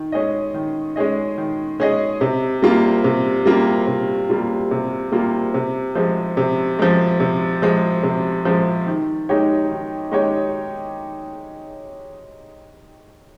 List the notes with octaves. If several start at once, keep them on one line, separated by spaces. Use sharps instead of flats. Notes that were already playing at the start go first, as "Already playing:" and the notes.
Already playing: D#3
G#3 C#4 G#4 D#5
D#3
G#3 C#4 G#4 D#5
D#3
G#3 C#4 G#4 D#5
C3
G3 A#3 F4
C3
G3 A#3 F4
C3
G3 A#3 F4
C3
G3 A#3 F4
C3
F3 G#3
C3
F3 G#3
C3
F3 G#3
C3
F3 G#3
D#3
G#3 D#4 G4 C#5
D#3
G#3 D#4 G4 C#5